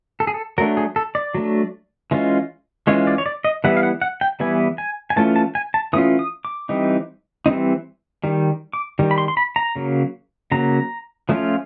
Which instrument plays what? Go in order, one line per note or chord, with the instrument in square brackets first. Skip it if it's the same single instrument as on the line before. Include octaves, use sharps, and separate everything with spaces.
[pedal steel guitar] A4
G#4
A4
F#3 A3 D4 A#4
G#4
A4
D5
F#3 A3 D4
E3 G#3 C#4 F4
E3 G#3 C#4 F4 C#5
D5
C#5
D5
D#5
E3 G3 B3 E4 F#5
F5
F#5
F#5
G5
E3 G3 B3 E4 G#5
G#5
G#5
E3 A3 C#4 F4 A5
A5
G#5
A5
E3 A3 C#4 F4 D#6
D#6
D6
E3 G3 C4 D#4
E3 G3 C4 D#4
D#3 G3
D6
D#3 G3
B5
C6
C6
B5
A#5
C#3 F#3 A#3
C#3 F#3 A#3 A#5
F3 A3 C#4 F4